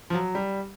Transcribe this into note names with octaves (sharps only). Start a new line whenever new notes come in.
F3
F#3
G3